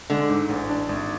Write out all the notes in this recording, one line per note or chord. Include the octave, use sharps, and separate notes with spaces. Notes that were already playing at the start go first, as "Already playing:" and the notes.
D3 G#3
G#2
A1
D4
G#1